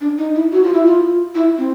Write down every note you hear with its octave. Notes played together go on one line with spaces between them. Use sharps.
D4
D#4
E4
F#4
F4
E4
F4
E4
C4